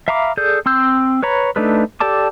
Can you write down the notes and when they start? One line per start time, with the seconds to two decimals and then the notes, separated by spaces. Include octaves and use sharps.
0.08 E5 F5 A#5 B5 D6
0.37 G#4 A4 D5 G6
0.66 C4 C6 E6 G6
1.23 B4 C#5 A#5 B5
1.56 A3 D4 D#4 A4 B4
2.00 G4 A4 D5 A5 D6